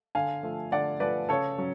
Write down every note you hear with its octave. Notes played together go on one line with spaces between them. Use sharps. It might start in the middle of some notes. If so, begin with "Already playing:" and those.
D3 F5 G#5
F3 A3
D3 D5 F#5
F3 A3 B4 D5
C#3 A4 C#5
F#3 C#4